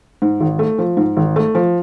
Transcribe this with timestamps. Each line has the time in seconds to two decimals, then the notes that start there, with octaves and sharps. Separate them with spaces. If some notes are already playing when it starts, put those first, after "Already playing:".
0.22 G#2
0.40 G#1
0.59 A3
0.78 F3
0.97 G#2
1.17 G#1
1.36 A3
1.55 F3